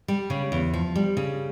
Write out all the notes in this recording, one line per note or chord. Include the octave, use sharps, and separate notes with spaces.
G3
C#3
E2
F3
G3
C#3